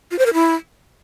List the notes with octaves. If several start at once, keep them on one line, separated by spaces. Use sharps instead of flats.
F4
C5
A#4
E4